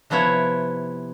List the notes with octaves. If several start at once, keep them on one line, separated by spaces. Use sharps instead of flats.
C3 F3 B3 E4 C#5 E5